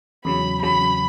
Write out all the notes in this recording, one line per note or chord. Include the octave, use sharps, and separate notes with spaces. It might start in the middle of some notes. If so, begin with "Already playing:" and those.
E2 C#3 F#3 B5
E2 C#3 F#3 B5